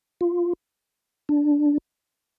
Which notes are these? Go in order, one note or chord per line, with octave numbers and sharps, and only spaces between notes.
F4
D4